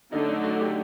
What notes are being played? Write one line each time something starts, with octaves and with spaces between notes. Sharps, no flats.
D3 F#3 A3 D#4
D#4
F#4
G4